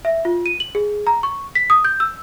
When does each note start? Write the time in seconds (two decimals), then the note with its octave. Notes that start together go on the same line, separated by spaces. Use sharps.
0.05 E5
0.25 F4
0.46 D#7
0.60 F#7
0.75 G#4
1.07 A#5
1.23 C#6
1.55 B6
1.70 D#6
1.84 G6
2.00 E6